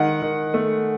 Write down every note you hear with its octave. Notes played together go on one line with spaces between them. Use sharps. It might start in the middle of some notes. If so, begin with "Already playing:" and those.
Already playing: D#3 G#3 F#5
D#3
A3